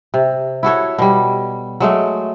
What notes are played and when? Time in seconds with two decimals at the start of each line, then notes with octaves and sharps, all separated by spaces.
0.14 C3
0.63 E4 F#4 A4 C#5
0.98 B2 G3
1.80 F#3 G#3 A3